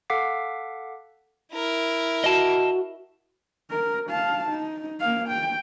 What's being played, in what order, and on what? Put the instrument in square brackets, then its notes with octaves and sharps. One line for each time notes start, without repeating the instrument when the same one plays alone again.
[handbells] A4 F5 F#5 D6 B6 C7
[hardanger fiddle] E4 A#4
[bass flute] F#4 [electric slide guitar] D#5 A5
[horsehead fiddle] A#4
F5 A5
D#4
A#3 F5
G5